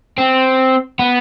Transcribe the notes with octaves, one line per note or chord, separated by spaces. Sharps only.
C4
B3